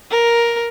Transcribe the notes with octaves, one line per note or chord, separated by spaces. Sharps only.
A#4